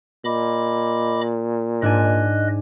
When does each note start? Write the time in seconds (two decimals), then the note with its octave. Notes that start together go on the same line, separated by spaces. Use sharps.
0.25 A#2 D#5 B5 D6
1.82 G#2 D4 D#5 G#5 F#6